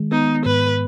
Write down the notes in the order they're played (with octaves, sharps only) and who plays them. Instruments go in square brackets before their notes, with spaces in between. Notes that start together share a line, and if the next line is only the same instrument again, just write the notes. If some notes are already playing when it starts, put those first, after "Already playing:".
Already playing: [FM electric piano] D#3 G#3
[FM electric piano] B3 [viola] D#4
[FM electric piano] G#2 [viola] B4